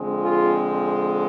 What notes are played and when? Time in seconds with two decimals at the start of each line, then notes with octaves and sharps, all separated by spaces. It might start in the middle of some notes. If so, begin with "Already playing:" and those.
Already playing: F2 D3 G#3 C4
0.22 F4 G#4